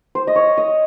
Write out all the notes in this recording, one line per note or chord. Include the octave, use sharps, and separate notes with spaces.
C5
D#5
C#5
D#5